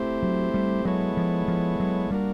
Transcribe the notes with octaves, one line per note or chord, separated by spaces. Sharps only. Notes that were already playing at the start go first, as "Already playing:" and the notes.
Already playing: A3 C4 E4 G4 C5
F#3
G3
F#3 G#3 B3 E4 A4 C#5
F3
F3
F#3
G3 A#3 D4 F#4 A#4